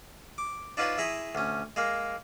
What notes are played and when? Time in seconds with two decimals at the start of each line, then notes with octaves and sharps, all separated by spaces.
0.38 D6
0.77 D4 D#4 F4 B4 C#5 F#5
0.98 E4 G#4 A#5 B5 C#6 D#6
1.35 D2 C#4
1.76 G#3 A#3 A#4